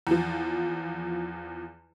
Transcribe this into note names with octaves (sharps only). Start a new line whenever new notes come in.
E2 F3